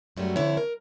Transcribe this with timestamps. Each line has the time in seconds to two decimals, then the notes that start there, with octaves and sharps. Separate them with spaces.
0.17 F#2 F#3 G3 A3 F#4
0.36 D3 F3 C4 C#4 E4 C#5
0.57 A#4